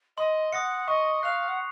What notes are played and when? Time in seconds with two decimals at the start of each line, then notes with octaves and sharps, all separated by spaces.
0.17 D#5 C6
0.52 F#5 D#6 A#6 C#7
0.87 D#5 C#6
1.23 F5 F#6 C7 F7
1.47 F#5